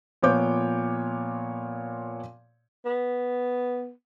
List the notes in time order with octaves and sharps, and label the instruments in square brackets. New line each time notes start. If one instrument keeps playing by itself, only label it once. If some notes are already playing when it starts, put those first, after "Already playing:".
[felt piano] A#2 F3 B3 C#5 D6 G6
[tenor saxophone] B3